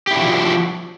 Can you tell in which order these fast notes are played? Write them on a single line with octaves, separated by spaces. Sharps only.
G4 E4 D4 F#4 F3